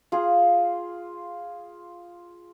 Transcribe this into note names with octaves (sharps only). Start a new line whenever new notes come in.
F4 G#4